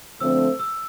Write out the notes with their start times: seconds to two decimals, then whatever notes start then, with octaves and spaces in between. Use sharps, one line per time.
0.20 D3 F3 A3 C4 E6
0.59 E6